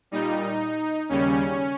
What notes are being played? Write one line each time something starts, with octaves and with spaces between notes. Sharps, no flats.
A#2 G3 D#4
D#2 C#3 G3 C#4